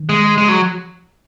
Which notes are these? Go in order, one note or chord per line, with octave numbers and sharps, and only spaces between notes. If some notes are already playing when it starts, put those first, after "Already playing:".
Already playing: D#3
G#3
C#3 G#3
F#3